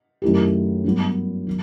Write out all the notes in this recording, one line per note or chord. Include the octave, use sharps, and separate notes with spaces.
F#2 D#3 A3 E4 G4
G2 F#3 B3
D#3 F#3